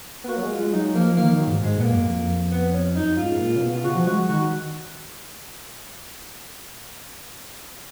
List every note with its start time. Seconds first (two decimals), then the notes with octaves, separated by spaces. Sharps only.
0.24 B3
0.28 A#3 F#4
0.37 F#3
0.43 G#3
0.51 F4
0.58 G#3
0.73 F#3 D#4
0.95 F3 A#3
1.17 D#3 A#3
1.32 D#3
1.40 F#3
1.48 G#2
1.61 G#2 G#3
1.77 A#2 B3
1.84 A#3
1.91 F#2
2.07 F2
2.51 B3
2.73 C#4
2.96 F#2 D#4
3.17 G#2 F4
3.30 G#2
3.39 A#2
3.56 C#3
3.61 B2
3.75 F4
3.84 C#3 F#4
3.95 F3
4.06 G#3 F#4
4.29 D#3 F#4